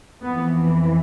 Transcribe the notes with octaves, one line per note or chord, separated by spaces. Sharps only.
F2 E3 B3